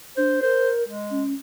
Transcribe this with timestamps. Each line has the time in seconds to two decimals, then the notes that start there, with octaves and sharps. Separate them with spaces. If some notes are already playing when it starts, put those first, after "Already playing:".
0.17 D4 C5
0.42 A#4 C5
0.88 G#3
1.10 C#4